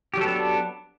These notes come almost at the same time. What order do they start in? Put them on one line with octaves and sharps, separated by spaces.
G4 F#3 A4 B3 D4